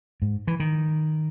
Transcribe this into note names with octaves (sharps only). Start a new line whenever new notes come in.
G#2
E3
D#3